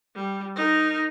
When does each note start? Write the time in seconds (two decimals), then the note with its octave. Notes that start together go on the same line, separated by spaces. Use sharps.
0.15 G3
0.56 D#4 A#4